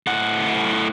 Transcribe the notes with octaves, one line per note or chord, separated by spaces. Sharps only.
A2 F#5